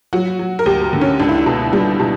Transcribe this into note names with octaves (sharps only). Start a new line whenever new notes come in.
F#3 F#4
F#3
A#4
D2 G4
D3
C#4
C#2 D4
E4
D4
B2
G3
B2